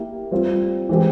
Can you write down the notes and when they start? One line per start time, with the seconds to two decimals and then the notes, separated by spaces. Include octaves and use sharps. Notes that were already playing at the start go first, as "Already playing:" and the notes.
Already playing: A#3 E4 G4 A#4
0.31 G3 C4 F4
0.89 E3 G#3 C4 G4